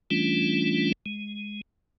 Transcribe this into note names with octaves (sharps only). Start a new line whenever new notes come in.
E3 G3 A3 C#4 D4 F4
G#3